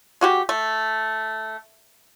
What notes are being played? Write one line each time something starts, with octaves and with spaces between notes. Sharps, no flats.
G#3 F#4 G4
A3